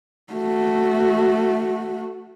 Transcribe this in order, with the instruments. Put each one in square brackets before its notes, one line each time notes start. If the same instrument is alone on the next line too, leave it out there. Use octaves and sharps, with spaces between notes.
[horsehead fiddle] A3 F#4